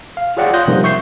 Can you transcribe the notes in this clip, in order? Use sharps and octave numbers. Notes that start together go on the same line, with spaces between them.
F5
F4 G#4 C#5 D5 F#5 G5
F5 C6 D#6 F#6 G6 A#6
C3 F3 G3 A3 D#4 A#4
E5 C#6 G6 C7